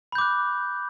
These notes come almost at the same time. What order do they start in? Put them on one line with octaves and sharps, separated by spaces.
B5 G6 D6 F#6